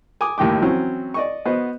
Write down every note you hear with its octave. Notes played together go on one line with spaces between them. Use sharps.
G#5 D6 D#6
D#2 A2 D#3 G5 D6
E3 F#3 C4 C#4
D5 D#5 C#6
B3 F#4 C5 D#5